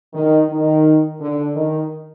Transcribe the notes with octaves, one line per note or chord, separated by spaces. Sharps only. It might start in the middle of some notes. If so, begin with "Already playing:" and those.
D#3
D#3
D3
D#3